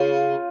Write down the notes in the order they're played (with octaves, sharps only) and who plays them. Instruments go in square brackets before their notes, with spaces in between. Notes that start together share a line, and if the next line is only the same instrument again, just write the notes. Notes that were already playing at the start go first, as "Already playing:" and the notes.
Already playing: [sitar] C#3 [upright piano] F4